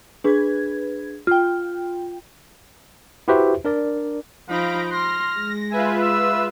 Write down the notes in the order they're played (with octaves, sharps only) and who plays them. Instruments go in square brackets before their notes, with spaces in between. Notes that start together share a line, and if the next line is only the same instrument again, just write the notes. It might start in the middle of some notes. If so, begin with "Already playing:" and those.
[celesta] D4 G#4 [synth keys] B4 G#6
[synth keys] F4 G5 [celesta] F6
[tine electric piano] E4 F#4 G4 B4 C5 E5
D4 A#4 D5
[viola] F3 D#4 [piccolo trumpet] F5 [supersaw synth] B5 A#6 D7
[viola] C6 [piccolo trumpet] F6 [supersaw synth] A#6
[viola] G#3
[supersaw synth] F4 B4 E5 [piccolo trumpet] G#5
[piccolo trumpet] E6